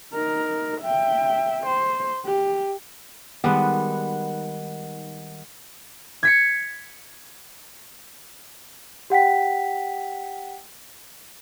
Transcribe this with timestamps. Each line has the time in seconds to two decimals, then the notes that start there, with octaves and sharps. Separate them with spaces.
0.14 D#4 A#4
0.81 E5 G5
1.66 C5
2.25 G4
3.44 D#3 G3 G#3 B3 F#5
6.23 G#6 B6 C#7
9.10 G4 F#5 G5 B6